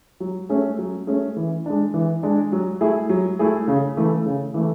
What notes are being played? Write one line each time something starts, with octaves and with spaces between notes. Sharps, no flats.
F#3
A3 C#4 G#4
F#3
A3 C#4 G#4
E3
G#3 D4
E3
G#3 D4
F#3
A3 E4 G#4
F#3
A3 E4 G#4
C#3
E3 A3
C#3
E3 A3